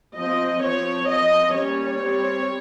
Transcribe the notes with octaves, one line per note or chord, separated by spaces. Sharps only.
F3 C4 D#5
F3 C4 C#5
F3 C4 D#5
G3 A#3 C#4 C#5
G3 C4